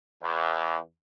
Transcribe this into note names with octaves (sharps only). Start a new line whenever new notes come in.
E2